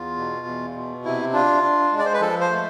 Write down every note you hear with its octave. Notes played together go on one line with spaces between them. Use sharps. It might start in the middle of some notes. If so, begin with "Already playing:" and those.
Already playing: E2 F4
B2
E2
B2
C3 E4
D4 F4
D4
G#3
D5
C5
B4
F3 A4
C5
A3